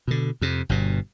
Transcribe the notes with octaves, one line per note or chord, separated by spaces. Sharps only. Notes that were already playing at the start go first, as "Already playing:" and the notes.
B2 D3
F2 C3
G1 G2 B2